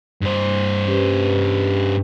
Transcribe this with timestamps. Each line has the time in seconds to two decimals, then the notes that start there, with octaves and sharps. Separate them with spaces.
0.21 G2 C5
0.87 C#4 G4 B4